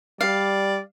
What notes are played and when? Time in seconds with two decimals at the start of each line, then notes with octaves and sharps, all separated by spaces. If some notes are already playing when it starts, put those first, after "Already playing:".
0.21 G3 D5 F5